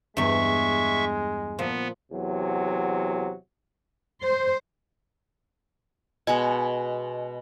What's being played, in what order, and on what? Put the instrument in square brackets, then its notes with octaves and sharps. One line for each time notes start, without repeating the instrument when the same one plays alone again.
[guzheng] E2 G2 [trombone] G#3 [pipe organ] E5 C#6
[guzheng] A#2 F3 [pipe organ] B3
[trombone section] E2 C3 F#3
[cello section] C5
[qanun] B2 G#3 [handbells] D#5 G#5